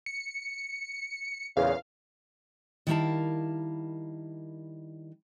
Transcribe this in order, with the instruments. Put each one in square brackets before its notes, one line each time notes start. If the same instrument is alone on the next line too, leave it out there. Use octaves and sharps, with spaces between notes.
[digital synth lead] C#7
[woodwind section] E2 A#2 C#3 [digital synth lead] F5
[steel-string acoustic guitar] D#3 G3 E4 A#4 F5 A5